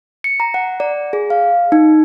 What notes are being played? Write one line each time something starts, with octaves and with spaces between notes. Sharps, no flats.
C#7
A#5
F#5
D5
G#4
F5
D#4